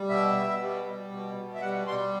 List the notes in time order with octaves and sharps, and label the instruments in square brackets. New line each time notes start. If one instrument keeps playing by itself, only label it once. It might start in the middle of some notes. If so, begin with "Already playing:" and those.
Already playing: [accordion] G3
B2 E5
B2
G3
G3
B2
B2
E5
G3 F#5
G3 C6